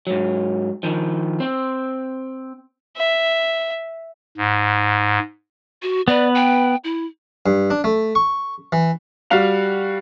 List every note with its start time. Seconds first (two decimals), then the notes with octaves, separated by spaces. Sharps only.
0.07 G#2 F#3
0.83 D#3 F3
1.40 C4
2.97 E5
4.38 G#2
5.82 F#4
6.08 B3 B4 D5
6.35 G5
6.84 E4
7.46 G2
7.70 D4
7.84 A3
8.15 C#6
8.72 E3
9.30 G3 F#4 F5 F#5 F7